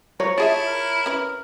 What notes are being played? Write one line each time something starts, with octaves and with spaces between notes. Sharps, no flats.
F3 C#5 A#5
E4 F4 G#4 E5 A5
A#4
C#4 B4